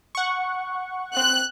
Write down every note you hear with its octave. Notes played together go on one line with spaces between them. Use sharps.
F#5 C#6
C4 F#6